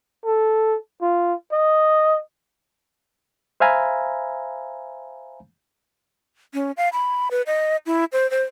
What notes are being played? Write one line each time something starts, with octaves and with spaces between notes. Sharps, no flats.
A4
F4
D#5
C5 E5 F5 G#5 A#5 B5
C#4
F5
B5
B4
D#5
E4
C5
C5